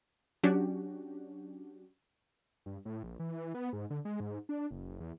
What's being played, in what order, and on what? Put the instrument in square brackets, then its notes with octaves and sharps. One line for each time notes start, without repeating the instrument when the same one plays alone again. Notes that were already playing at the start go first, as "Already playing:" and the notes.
[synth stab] F#3 C#4 D4 F#4 G4
[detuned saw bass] G2
A2
A#1
E3
B3
G#2
D3
G#3
G#2
D4
F#1
E2